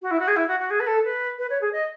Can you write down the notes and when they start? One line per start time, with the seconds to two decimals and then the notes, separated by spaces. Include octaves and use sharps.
0.02 F#4
0.10 E4
0.19 F#4
0.27 G#4
0.36 E4
0.47 F#4
0.59 F#4
0.70 G#4
0.80 B4
0.86 A4
1.04 B4
1.38 B4
1.49 C#5
1.61 G#4
1.72 D#5